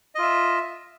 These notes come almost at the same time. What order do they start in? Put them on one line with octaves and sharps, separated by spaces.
D#5 F4 E5